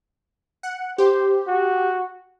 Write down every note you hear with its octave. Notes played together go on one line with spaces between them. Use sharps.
F#5
G4 C5
F#4